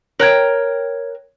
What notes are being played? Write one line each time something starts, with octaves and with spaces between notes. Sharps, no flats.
A#4 C#5 G5 F#6 G#6